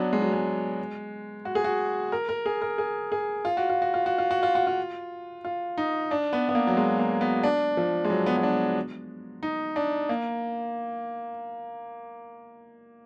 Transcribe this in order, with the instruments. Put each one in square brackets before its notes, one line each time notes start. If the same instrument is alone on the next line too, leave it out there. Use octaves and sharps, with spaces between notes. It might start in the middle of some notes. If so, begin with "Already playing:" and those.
Already playing: [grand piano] F#3 B3 D4
G#3
F#3
G#3
F#4
G#4
F#4
A#4
A#4
G#4
A#4
G#4
G#4
F4
F#4
F4
F#4
F4
F#4
F4
F#4
F4
F#4
F4
F4
D#4
D4
B3
B3
A#3
F#3
G#3
A#3
B3
D4
F3
G#3
F#3
B3
B3
D4
D#4
D4
A#3